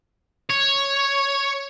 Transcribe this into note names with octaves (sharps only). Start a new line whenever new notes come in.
C#5